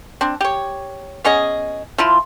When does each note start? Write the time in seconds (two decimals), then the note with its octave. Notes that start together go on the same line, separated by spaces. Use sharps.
0.21 C4 D4
0.41 G4 C#5
1.24 B3 C#4 G#4 D#5
1.98 F3 E4 F4